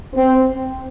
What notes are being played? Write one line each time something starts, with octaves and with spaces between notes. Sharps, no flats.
C4